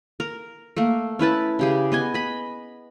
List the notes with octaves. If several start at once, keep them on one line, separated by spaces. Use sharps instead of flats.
A#4
A3 A#3
C#4 E4 B4 A5
C#3 G4 G#4
B3 D#5 G#5
D#5 B5